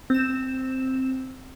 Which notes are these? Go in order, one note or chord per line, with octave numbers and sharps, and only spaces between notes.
C4 E7